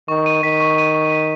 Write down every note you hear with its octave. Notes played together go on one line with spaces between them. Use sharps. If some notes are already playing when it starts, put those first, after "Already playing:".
D#3 C#6
D#7
D#3 B6
C#6
D#7
C#6
B6